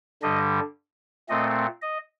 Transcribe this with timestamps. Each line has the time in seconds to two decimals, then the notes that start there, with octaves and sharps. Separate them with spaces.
0.22 G2 D3 G3 D4 D#5
1.29 A#2 A3 C4 D#5
1.82 D#5